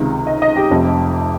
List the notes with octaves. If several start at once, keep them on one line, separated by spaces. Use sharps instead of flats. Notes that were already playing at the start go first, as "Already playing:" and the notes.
Already playing: C#2 C3 D#3
D#5
D#5
G4
F1 F2 C3